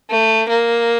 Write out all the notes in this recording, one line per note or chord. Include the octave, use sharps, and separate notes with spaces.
A3
A#3